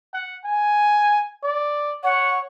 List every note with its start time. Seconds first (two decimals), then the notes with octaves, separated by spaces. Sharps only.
0.13 F#5
0.44 G#5
1.43 D5
2.04 C#5 F#5